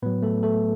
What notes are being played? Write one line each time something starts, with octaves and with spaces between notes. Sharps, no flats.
A2 F#3 B3 B4
A3 A4
A3 A4